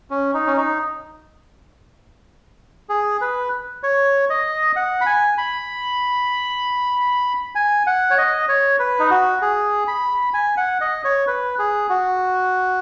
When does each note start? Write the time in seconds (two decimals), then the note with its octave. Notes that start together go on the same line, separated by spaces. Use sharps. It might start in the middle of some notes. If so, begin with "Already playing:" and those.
0.10 C#4
0.34 D#4
0.46 C#4
0.57 D#4
2.89 G#4
3.21 B4
3.83 C#5
4.30 D#5
4.76 F#5
5.01 B5
5.06 G#5
5.38 B5
7.55 G#5
7.87 F#5
8.10 C#5
8.18 D#5
8.48 C#5
8.79 B4
8.99 D#4
9.10 F#4
9.42 G#4
9.88 B5
10.34 G#5
10.57 F#5
10.81 D#5
11.04 C#5
11.27 B4
11.59 G#4
11.89 F#4